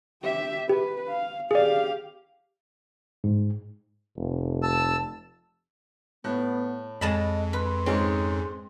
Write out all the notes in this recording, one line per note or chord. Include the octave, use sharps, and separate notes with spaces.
G4 E5
G4 B4
F5
G4 G#4 D5 F5
G#2
F1
A5 E6
A2 B3 F#6
F2 G#3 D#5 A5 B5
B4 C6
G#2 G#3 C4 C#4